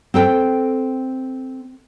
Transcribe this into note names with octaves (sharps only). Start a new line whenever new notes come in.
C4 A4 G5